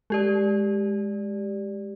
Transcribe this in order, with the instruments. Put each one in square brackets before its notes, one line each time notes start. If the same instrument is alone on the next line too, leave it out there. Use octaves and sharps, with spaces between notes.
[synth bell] G#3 G4 D5